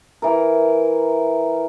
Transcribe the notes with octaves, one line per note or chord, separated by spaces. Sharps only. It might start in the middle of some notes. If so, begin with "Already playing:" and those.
E3 A#4